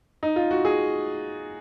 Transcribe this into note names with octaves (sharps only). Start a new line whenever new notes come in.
D#4
F4
F#4
G#4